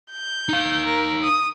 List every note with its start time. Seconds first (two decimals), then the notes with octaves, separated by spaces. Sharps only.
0.11 G6
0.49 D#4 F5
0.86 A#4
1.23 D#6